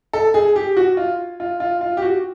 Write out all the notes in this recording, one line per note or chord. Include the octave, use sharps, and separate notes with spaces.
A4
G#4
G4
F#4
F4
F4
F4
F4
G4
F#4